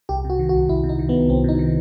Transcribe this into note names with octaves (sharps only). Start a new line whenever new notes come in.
C2 G4
C3
F#4
D#3
F#4
C2
C2 E4
C3
D#4
D#3
B3
C2
C2 C4
C3 D#4
D#3